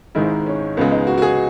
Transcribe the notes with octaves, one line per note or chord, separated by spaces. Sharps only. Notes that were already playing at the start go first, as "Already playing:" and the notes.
G#1 G#2 D#3 G#3 E4
C#4
C#2 C#3 G#3 B3
D#4
F#4
F#4
G#4